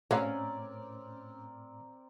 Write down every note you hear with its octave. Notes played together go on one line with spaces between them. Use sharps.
A2 C4 C#4 F#4 A#4 D5 F5